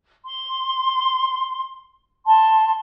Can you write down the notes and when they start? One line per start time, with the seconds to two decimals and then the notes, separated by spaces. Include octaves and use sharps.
0.25 C6
2.25 A5 C6